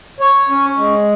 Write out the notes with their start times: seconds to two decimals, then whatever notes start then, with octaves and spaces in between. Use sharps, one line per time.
0.20 C#5
0.49 C#4
0.77 G#3